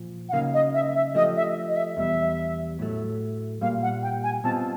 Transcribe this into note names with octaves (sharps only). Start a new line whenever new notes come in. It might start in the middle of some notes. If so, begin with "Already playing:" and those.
Already playing: A#2 F3
F#5
C#3 F#3 A#3 D#4 F5
D#5
E5
E5
F3 A3 D4 G4 D#5
E5
D#5
E5
E2 B2 G3 E5
A2 F#3 A3
A#2 G3 A#3 F5
F#5
G5
G#5
B2 G3 C4 F4 A5